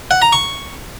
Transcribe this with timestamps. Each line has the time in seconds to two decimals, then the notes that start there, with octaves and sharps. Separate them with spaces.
0.11 F#5
0.22 A#5
0.33 C#6